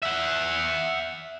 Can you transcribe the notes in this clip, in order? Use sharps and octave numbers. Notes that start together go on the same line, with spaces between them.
E5 F#5